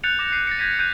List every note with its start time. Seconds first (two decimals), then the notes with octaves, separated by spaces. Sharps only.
0.04 F#6 G6 A6 C#7 F7
0.19 D6 A#6 E7
0.32 D6 C7 D#7
0.47 A6 A#6 C#7
0.59 G6 G#6 A#6 B6 D#7
0.79 F#6 G6 C#7 D#7